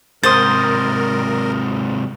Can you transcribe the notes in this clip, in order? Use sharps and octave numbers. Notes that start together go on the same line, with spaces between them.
G#2 C3 A#4 C5 D#6 A6